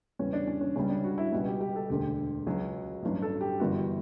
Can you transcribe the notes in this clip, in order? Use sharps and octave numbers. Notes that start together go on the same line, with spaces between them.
E2 C#3 G3 C#4
D4
C#4
C#4
C#2 C#3 G3 C#4
D4
F#4
E4
C#2 B2 G3 F#4
G4
G4
A4
E1 D2 D3 G4
C#2 C#3 F#3
A1 G2 F#3
A4
G4
G1 F#2 E3 G3 F#4